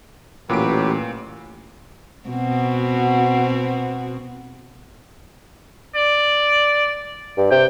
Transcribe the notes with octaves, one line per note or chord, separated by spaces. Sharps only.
A1 A#2 F#3 G4 B4 D7
B2 C4 F#4
D5
G2
C3 G5